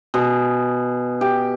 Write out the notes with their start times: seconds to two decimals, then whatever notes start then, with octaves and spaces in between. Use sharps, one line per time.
0.14 B2 G#4
1.21 G4